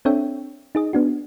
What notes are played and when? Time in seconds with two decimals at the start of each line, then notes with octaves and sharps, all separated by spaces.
0.05 C4 D4 A4 C#5 E5 G5
0.75 D#4 G#4 D#5
0.93 B3 D4 F#4